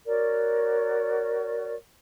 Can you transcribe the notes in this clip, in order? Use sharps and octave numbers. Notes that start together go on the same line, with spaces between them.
F#4 A#4 C#5 D5